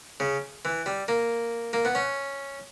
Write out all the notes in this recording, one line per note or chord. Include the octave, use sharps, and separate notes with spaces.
C#3
E3
G3
A#3
A#3
B3
C#4